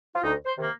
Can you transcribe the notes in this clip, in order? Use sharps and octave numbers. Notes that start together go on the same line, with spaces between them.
F4
D2 D#4
C5
C3 D#3 A#3